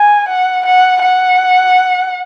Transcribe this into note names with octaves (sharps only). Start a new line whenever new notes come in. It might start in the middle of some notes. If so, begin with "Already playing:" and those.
Already playing: G#5
F#5
F#5
F#5